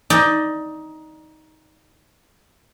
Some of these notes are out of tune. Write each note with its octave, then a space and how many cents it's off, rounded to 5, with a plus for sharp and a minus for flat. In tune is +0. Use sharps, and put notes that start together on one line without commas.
D#4 +15 D5 +15